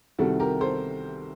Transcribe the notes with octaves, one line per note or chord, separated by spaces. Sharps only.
C2 C3 D#3 G3 F#4 A4
G4 A#4
A4 C5